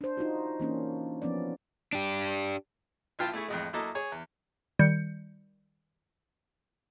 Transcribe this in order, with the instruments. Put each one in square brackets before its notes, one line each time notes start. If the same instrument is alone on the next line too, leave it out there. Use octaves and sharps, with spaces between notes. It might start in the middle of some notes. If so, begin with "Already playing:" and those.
[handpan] D4 C5
D4 D#4 F4 F#4
E3 A#3 C#4 D4
F3 B3 C#4 D5
[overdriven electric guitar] D4 G4
[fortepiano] B1 E4 F4 G5 A5
A3 E4 G#4 C#6
F2 A2 G#3
F#3 A#3 E4 A4 D#5
G#4 C#5 G#5
E2
[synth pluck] D#3 G3 G6 C#7